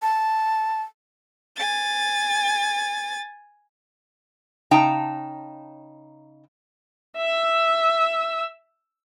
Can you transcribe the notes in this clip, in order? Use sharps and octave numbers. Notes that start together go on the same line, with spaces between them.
A5
G#5 A6
C#3 D#4 G5 A5 A#5
E5 E6